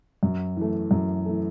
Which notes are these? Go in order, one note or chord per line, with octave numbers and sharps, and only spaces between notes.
F#2
E3 A3
F#2
E3 A3